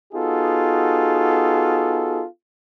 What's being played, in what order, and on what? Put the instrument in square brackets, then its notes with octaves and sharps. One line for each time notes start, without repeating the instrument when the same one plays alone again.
[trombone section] B3 D#4 F4 F#4 G#4 A4